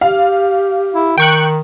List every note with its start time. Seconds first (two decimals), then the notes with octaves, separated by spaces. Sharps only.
0.01 G4 F5
0.94 E4
1.18 D#3 G5 C#6 F#6